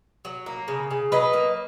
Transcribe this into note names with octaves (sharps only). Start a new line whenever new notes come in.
F#3
A#3
C#3
C#3
F#3 B4 D#5
A#3